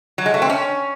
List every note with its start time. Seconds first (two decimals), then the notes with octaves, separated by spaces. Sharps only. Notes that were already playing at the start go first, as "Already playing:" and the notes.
0.18 F#3
0.26 G#3
0.34 A3
0.42 C4
0.50 C#4